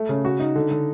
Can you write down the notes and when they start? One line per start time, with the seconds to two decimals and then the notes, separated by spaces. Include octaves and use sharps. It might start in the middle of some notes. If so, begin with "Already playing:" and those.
Already playing: A3
0.09 C#3
0.25 F#4
0.40 D#4
0.56 D3
0.71 D3